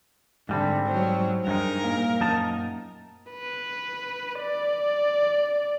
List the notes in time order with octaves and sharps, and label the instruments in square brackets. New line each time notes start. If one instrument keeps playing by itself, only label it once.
[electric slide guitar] G#2 G3 C4 [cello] D3 [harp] E5 A5 B5
[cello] F#3 [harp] C5
[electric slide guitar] G2 G#3 D#4 [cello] A#4
[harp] A#2 F5
[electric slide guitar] F#2 D#4 A5
[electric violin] B4
D5